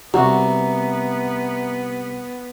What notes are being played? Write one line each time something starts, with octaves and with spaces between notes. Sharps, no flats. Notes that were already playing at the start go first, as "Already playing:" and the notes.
C2 B3 F#4 E5 A#5